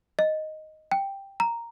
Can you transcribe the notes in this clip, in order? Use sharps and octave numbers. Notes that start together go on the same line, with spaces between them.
D#5
G5
A#5